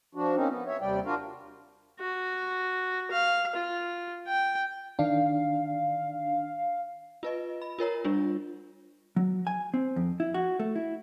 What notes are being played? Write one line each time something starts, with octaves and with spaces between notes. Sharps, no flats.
F3 D4 F#4
A#3 C4 C#4 D#4
B3
C#5 E5
D#2 C3 G3 D5 G5
D4 F4 F#4 A#4 F5
F#4
F5
F4
G5
D#3 D4 F5
F4 B4 D#5
B5
F4 A#4 C#5 A#5
G3 D4 F4
F#3
G#5
C4
F2
E4
F#4
A3
E4